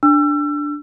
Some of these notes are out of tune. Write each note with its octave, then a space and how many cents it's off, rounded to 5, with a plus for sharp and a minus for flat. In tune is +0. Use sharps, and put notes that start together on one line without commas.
D4 +0 E6 +35